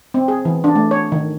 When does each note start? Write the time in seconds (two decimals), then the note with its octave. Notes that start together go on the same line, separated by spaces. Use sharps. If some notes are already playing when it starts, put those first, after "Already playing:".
0.14 C4
0.28 G#4
0.45 E3
0.64 D4
0.76 A3
0.91 C#5
1.12 D#3